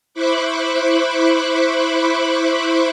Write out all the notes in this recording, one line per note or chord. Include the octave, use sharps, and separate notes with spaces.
E4 C5 B5 C#6 D6 F#6